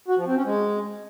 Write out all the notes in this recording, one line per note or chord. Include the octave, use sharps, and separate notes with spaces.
F#4
F3
C4
C#4
G#3